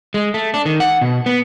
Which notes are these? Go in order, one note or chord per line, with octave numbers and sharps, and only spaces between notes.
G#3
A3
D4
D#3
F#5
B2
B3